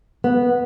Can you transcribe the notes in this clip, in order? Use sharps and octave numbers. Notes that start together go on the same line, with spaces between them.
B3